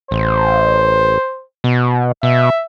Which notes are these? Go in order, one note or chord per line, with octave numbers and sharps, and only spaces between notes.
A1 C5
B2
B2 E5